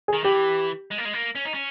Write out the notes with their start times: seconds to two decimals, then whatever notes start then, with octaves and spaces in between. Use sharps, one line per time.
0.08 G#4
0.13 D#3
0.24 E3 G4
0.91 G#3
0.98 A#3
1.05 G#3
1.13 A#3
1.35 C#4
1.45 D#4
1.54 C#4